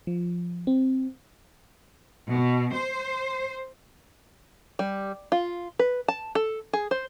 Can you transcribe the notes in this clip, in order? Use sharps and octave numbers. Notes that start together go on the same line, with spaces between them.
F3
C4
B2
C5
G3
F4
B4
A5
A4
G#4
C5